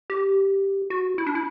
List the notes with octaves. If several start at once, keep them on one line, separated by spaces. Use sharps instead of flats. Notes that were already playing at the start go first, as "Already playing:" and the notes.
G4
F#4
E4
D4
E4